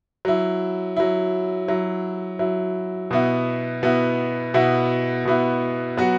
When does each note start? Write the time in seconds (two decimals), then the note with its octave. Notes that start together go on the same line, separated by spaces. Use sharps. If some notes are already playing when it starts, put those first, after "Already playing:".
0.25 F#3 E4
0.97 F#3 E4
1.68 F#3 E4
2.39 F#3 E4
3.11 B2 B3 E4
3.83 B2 B3 E4
4.54 B2 B3 E4
5.25 B2 B3 E4
5.97 F#3 B3 F#4